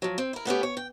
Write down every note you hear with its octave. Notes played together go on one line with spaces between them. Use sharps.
F3 F#3
C4
E4 A#4
A3 B3 C#4 G4
C#5
G5